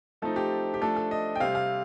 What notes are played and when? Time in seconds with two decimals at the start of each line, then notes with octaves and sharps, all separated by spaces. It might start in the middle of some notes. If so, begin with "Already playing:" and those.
0.22 F3 A3 C4 D#4 A4
0.36 G4
0.74 G4
0.81 F3 A3 D4 A4
0.96 A4
1.11 D#5
1.35 G5
1.40 C3 G3 C4 F5
1.55 F5